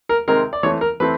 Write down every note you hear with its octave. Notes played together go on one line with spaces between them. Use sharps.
A#4
C3 D#3 G#3 C4 A#4
D5
E3 A3 C4 C#5
A#4
E3 A3 C4 B4